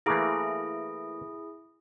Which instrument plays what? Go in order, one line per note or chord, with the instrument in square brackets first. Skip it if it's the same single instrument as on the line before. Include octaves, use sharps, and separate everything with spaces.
[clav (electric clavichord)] E3 A3 A#3 [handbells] E4 G#4